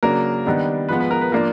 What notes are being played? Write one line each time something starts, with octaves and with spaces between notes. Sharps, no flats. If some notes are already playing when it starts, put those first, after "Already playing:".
C#3 F#3 A#3 D4 A#4
D#3 G3 B3 D4
F3 G#3 B3 B4
B4
A#4
B4
F3 A#3 D4 A#4